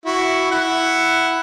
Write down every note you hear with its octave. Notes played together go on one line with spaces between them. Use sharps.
E4 F#4
E4 F#5